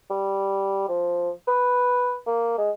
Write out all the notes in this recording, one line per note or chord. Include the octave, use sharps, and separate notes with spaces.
G3
F3
B4
A#3
G#3